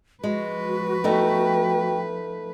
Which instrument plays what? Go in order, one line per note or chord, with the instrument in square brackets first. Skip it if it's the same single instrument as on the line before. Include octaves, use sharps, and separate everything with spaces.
[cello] F3 B4 [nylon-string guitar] G#3 [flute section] F#4
[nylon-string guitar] A3 B3 D#4 [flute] G5